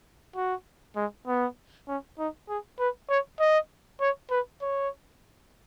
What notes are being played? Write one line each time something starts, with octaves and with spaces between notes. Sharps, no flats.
F#4
G#3
B3
C#4
D#4
G#4
B4
C#5
D#5
C#5
B4
C#5